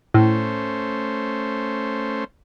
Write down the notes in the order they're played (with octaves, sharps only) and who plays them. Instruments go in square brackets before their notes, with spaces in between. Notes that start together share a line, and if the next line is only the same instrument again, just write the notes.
[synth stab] A2 [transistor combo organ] A3 C#4 C5